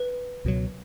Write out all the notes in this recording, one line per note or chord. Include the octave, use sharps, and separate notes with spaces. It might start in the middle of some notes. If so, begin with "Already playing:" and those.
Already playing: B4
C#2 B2 F#3